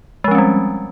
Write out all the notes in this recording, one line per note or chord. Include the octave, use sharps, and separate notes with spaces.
F3 G3 G#3 C4 C#4